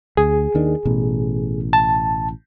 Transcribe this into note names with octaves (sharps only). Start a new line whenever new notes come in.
D2 G#4
D#2 D#3 D4
A1 B2
A5